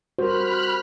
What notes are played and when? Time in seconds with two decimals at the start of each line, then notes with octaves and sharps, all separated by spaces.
0.19 G3 F#4 G4 A#4 C5 B5 F6 F#6